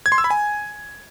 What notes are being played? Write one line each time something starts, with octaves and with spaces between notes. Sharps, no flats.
G#6
C6
E6
B5
G#5